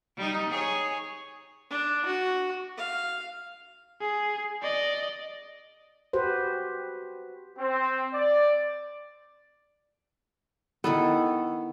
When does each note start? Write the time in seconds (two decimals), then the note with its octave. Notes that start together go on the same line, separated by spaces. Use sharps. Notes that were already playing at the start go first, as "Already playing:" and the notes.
0.17 G3 D#4
0.50 G#4 C#5
1.70 D4
2.05 F#4
2.77 F5
4.01 G#4
4.62 D5 D#5
6.13 F#4 G4 B4 C5
7.57 C4
8.14 D5
10.84 D#3 B3 E4 A4